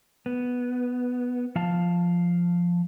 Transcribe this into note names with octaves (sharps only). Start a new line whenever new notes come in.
B3
F3 F5 A5